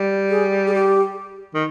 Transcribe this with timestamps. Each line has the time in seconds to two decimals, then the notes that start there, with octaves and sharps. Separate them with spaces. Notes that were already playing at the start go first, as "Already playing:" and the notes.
Already playing: G3
0.30 G#4
0.67 G#4
0.74 G4
1.55 D#3